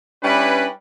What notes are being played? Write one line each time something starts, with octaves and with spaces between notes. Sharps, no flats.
G3 C#4 D4 E4 B4